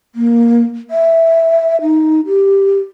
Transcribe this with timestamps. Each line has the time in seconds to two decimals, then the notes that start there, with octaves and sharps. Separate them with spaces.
0.15 A#3
0.90 E5
1.82 D#4
2.27 G4